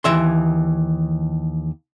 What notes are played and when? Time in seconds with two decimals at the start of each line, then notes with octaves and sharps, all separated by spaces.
0.04 D#2 E3 E5 C6